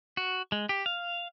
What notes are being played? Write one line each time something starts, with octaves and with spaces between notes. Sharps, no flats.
F#4
G#3
G4
F5